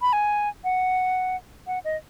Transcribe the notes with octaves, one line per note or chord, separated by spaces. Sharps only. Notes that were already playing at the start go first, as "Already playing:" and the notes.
B5
G#5
F#5
F#5
D#5